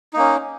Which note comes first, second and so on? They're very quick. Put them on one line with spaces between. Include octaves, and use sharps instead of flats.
D#4 A#3 C#4